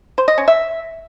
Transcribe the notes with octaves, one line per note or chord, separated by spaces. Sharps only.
C5
D#5
C#4
E5